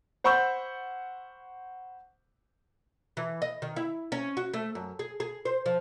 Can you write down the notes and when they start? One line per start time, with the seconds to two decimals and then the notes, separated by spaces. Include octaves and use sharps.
0.24 C5 F#5 B5 C#6 E6 G6
3.17 E3
3.42 D#5
3.62 D#3
3.76 E4
4.12 C#4
4.37 F#4
4.54 A3
4.75 F#2
4.99 G#4
5.20 G#4
5.45 C5
5.66 F3